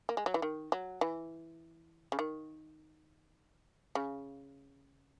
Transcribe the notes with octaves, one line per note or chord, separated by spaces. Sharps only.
A#3
G#3
F#3
E3
D#3
F#3
E3
C#3
D#3
C#3